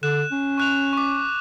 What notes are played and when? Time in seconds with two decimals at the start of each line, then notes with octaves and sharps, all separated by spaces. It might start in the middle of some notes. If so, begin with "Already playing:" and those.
0.03 D3 F#6 E7
0.32 C#4
0.58 C#6 F#6 F7
0.93 C#6 D6